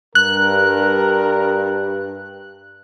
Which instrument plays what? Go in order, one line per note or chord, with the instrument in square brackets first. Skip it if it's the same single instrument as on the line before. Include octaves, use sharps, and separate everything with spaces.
[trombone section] G2 [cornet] A#4 [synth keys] F#6